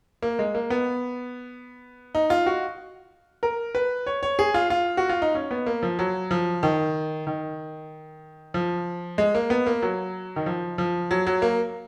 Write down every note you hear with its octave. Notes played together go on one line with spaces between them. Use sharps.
A#3
G#3
A#3
B3
D#4
F4
F#4
A#4
B4
C#5
C#5
G#4
F4
F4
F#4
F4
D#4
C#4
B3
A#3
F3
F#3
F3
D#3
D#3
F3
G#3
A#3
B3
A#3
F#3
D#3
F3
F3
F#3
F#3
A#3